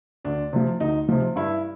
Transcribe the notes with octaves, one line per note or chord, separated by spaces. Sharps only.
D2 D4
C3 F3
D2 D#4
C3 F3
G2 E4